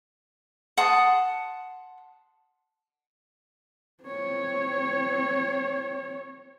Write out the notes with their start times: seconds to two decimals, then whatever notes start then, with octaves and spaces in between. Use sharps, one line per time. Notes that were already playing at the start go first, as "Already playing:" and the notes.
0.77 F#5 A5 C6 D#6
4.04 C4 C#5